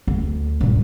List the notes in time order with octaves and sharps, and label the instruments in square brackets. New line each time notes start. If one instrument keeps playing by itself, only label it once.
[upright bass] D2
A#1 G2